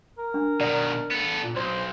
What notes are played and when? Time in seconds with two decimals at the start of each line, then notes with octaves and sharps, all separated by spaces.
0.18 A#4
0.34 D4
0.61 B2 D#3 D5
1.11 B3 A4
1.44 A#2
1.56 B1 C5